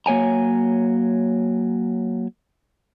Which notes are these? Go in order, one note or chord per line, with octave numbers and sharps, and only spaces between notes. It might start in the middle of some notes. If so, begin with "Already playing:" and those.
F#3 A#3 C#5 G#5 A#5